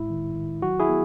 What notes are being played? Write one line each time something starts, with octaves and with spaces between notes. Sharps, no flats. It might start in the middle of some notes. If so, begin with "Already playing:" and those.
Already playing: A2 G#3 E4
D#3
D#3
F#3 F#4
E4 G#4
B3